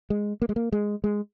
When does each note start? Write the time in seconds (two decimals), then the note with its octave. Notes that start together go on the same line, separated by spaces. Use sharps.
0.10 G#3
0.42 A#3
0.49 G#3
0.56 A#3
0.72 G#3
1.04 G#3